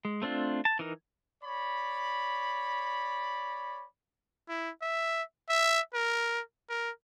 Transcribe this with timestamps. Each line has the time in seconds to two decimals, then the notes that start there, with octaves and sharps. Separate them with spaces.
0.05 G#3
0.22 A3 C4 D4 F4
0.65 A5
0.79 E3 D#4 A#4
1.43 C#5 D5 B5
4.48 E4
4.82 E5
5.49 E5
5.94 A#4
6.69 A#4